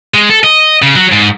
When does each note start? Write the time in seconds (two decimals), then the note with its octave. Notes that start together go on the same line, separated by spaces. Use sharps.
0.14 G#3
0.30 A4
0.44 D#5
0.82 C#3
0.96 F#3
1.12 G#2